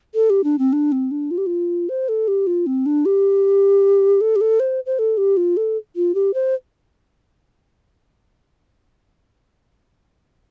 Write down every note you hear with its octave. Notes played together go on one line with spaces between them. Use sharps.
A4
G4
D4
C4
D4
C4
D4
F4
G4
F4
C5
A4
G4
F4
C4
D4
G4
A4
G4
A4
C5
C5
A4
G4
F4
A4
F4
G4
C5